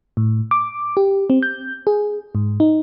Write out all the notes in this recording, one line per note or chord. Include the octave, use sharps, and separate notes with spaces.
A2
D6
G4
C4
G6
G#4
G#2
D#4